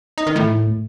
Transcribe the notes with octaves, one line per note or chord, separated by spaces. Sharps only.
D#4
D#3
A2